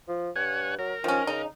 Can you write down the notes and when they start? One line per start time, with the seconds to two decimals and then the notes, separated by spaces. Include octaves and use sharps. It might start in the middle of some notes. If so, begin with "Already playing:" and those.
0.09 F3
0.36 G2 C#5 F#5 G#5
0.79 F#3 A#4
1.04 D#3 F3 C#4
1.27 C#3 D#4